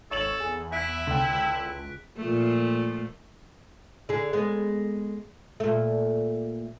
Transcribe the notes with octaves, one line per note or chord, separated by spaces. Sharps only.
G#1 A4 C#5 E7 F#7
E2 G#4
E4 E5 F#6 B6 D7
C#2 D3 G5
A#2 F3 A3
D3 G#4
G#3 B3
A#2 A3